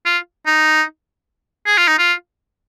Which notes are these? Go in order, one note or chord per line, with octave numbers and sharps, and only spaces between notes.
F4
D#4
G#4
F4
D#4
F4